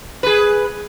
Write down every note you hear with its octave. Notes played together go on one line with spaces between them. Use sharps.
G#4 B4